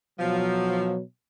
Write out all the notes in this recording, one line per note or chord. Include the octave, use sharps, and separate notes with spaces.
B2 F3 F#3